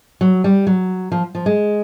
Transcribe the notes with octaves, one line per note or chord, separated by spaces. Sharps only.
F#3
G3
F#3
F3
F3
G#3